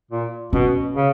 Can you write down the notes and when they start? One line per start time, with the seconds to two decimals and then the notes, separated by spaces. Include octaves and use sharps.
0.11 A#2
0.53 B2 C#4
0.96 C#3